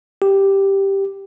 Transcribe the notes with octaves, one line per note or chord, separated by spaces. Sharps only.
G4